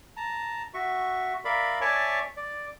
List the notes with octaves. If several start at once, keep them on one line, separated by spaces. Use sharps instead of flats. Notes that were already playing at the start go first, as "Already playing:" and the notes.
A5 A#5
F#4 E5 C#6
A#4 D5 E5 F5 B5
C#5 D5 E5 G#5 A5 C#6
D5